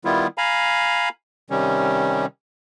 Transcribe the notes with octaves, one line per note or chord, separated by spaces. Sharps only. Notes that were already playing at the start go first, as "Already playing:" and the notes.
D#3 G3 B3 E4 F4
F5 G#5 A#5 B5
C3 D#3 G3 C#4